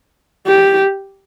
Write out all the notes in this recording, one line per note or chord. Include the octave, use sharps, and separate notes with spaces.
G4